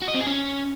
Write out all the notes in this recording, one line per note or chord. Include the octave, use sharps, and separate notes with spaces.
F#4
D#5
C4
G#4
C#4